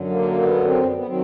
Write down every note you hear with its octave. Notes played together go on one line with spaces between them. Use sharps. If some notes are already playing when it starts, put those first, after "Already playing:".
Already playing: F#2 D3 F#3
A#3
B3
C4
B3
B3
D#3 F#3 C4